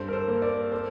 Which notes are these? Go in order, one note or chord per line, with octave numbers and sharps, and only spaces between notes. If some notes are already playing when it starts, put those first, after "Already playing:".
Already playing: G2 A4 C5
A#4
A4 C5
A#3
A#4 D5
A4 C5